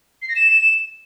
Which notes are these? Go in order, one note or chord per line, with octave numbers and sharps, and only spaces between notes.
C7
A#6
E7